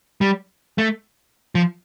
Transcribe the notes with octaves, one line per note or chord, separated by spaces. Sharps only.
G3
A3
F3